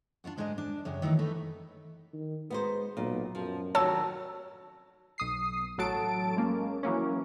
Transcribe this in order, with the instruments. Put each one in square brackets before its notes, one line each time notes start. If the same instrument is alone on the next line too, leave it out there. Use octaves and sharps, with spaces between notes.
[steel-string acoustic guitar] D4 D#4 F4 F#4
G#2 G#3 D4 B4 D#5
D4
F#2 C#3 G4
D#3 E3 F#3 A3 D4 D#4
A3 D#4 B4
[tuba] D#3
[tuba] G#3 [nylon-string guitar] B3 D#4 C5
[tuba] B1 [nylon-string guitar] A#2
[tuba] F#2 [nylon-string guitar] F3
[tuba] F1 [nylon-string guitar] D#3 F#3 F#5 [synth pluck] C#5 A5 E6
[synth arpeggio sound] B1 D#6 C7
A1 F#3 A4 A5 D7
G#3 A#3 C#4
E3 F#3 A#3 C#4